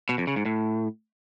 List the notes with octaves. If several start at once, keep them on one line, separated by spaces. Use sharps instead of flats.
B2
F2
C#3
G#2
A2